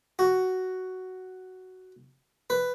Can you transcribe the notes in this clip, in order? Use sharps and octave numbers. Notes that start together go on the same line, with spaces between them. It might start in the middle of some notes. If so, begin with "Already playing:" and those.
F#4
B4